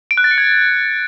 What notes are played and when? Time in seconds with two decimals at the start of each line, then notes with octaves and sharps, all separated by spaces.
0.11 D7
0.17 F#6
0.24 A6
0.31 C#7
0.38 G#6